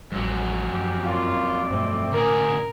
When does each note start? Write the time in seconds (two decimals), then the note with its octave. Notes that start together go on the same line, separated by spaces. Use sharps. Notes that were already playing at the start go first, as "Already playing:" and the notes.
0.12 A1 F2 F#3 G3
0.72 F#2 G4
1.05 A#3 C#4 F4 D5
1.70 G2 B2 A3 C4
2.12 D2 A2 C3 C#4 G#4 A#4